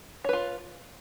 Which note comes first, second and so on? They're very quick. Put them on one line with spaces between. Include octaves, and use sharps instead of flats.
C#5 B4 F4